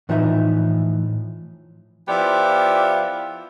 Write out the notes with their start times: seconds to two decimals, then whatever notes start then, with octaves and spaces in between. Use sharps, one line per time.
0.09 A2 E3 F3 D#4 A#4 E5
2.08 F3 B3 E4 F4 G4 D5